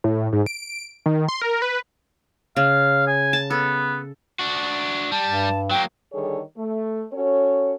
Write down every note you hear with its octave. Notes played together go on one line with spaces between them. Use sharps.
A2
G#2
D7
D#3
C6
A#4
B4
C#3 F5
G#5
A5
B3 A4
D4 F#4
G3 A5
G2
F#3 A#3 G5
D3 D#3 G3 G#4 A4 C#5
A3
C#4 F#4 A4 C#5